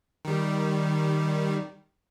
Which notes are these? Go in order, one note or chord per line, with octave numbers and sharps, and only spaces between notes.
D#3 G3